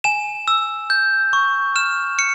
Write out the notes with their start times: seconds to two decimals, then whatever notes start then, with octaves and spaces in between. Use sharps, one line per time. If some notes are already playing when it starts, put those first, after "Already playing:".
0.04 G#5 E7
0.48 E6
0.90 G6
1.33 C#6
1.76 F6 E7
2.18 F6 C#7